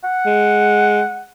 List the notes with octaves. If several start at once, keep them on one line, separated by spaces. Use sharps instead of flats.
F#5
G#3